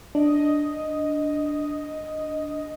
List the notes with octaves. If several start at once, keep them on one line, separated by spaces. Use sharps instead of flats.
D4 D#5